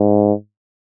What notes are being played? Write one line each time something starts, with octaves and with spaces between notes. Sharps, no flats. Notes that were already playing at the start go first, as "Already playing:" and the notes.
Already playing: G#2